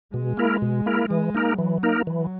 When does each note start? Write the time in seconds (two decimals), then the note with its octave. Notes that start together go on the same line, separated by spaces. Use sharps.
0.14 B2 G#3
0.37 A#3 E4 A#4
0.62 B2
0.86 A#3 E4 A#4
1.10 E3 G#3
1.35 A#3 D#4 A#4
1.58 E3 F#3
1.83 A#3 D#4 A#4
2.07 E3 F#3